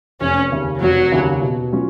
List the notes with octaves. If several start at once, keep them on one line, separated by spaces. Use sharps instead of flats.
F1 C#4
D#2 C#3
F1 F#3
D#2 C#3
B2
F#3 C#4 F4